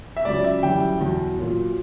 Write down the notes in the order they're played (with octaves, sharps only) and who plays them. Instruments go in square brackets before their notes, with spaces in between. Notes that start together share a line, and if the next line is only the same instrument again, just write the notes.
[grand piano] E5
C#2 C#3 F#3 D5
E5
F#2 E3 G3 G5
E2 B2 F#3
A#2 F#3